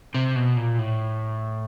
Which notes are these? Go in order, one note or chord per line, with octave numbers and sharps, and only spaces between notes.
C3
B2
A#2
A2